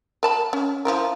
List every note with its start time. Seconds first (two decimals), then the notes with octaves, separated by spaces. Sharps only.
0.23 A#4 A5 B5
0.53 C#4
0.85 F3 E4 A#4